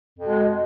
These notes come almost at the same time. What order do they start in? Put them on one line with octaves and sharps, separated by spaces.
F2 B2 G#3